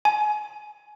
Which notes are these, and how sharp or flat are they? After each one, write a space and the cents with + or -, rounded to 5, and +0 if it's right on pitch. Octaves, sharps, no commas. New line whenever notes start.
G#5 +25